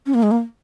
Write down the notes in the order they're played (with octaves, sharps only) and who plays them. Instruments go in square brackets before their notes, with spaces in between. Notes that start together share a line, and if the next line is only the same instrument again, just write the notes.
[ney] C#4
A#3
G#3
A#3